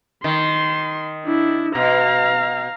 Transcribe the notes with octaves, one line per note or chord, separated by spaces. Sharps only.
D#3 C6
D4 E4
B2 F5 A#5